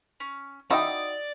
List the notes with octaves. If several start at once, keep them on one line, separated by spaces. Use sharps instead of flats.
C#4
D#4 E4 F#4 D5 D#5 G5 D#6 E6